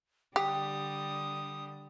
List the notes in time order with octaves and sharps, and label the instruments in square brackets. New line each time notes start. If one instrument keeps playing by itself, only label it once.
[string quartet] D3 G3 [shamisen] G4 [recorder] D#6